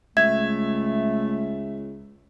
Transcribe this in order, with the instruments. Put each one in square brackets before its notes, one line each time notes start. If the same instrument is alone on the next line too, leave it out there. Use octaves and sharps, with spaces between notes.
[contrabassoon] C#2 [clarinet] A3 [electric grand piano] E5 [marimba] G#6